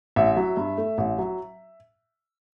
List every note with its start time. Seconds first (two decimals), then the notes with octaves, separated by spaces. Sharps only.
0.16 A1 E5
0.37 F#3
0.57 G2
0.78 A3
0.98 A1
1.19 F#3